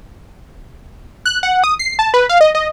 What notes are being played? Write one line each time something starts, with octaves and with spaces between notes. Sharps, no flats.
F#6
F#5
D#6
C7
A5
B4
F5
D#5
D#5